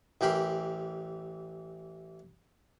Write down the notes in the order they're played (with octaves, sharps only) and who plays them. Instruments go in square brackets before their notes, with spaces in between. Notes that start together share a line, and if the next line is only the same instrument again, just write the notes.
[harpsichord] A1 E3 G4 A#4 B5 C6